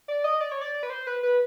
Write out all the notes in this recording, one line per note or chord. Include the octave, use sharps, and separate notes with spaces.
D5
D#5
D5
C#5
D5
B4
C5
B4
B4